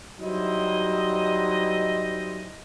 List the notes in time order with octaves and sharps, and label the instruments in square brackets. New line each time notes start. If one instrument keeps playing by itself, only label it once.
[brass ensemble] F#3 G3 D#4 E4 C5 D#5